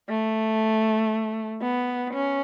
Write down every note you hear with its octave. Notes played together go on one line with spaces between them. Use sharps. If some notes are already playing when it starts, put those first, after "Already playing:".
A3
B3
C#4